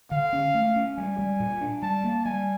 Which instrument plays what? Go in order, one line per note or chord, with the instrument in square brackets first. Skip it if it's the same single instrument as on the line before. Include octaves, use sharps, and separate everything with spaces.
[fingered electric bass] D3 [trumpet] F5
[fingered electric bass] C#4
A3
C#4
[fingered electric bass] G3 [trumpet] G#5
[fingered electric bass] G3
A#2
D4
[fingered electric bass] G3 [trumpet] A5
[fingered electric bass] A#3
[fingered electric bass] G3 [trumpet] G#5